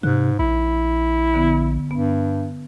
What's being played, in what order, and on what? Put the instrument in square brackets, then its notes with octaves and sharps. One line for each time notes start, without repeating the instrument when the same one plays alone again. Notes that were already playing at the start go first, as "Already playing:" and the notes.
[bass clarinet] G#2 [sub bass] C3 [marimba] F#6
[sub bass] A#1 [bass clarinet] E4
[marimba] D3 B3
[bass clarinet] G2 [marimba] B3